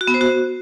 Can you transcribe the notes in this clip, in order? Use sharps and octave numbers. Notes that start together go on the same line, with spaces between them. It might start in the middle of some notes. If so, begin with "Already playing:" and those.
F#4
B3
C5
F#4